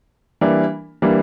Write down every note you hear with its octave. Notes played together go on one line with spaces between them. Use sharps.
E3 G3 A#3 D4
E3 G3 A#3 D4